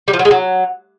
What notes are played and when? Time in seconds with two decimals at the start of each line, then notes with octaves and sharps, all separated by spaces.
0.08 G3
0.13 F3
0.19 F#3
0.25 G#3
0.31 F#3